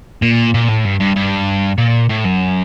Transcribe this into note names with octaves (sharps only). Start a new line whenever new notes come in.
A#2
A#2
A2
G2
G2
G2
A#2
A2
F#2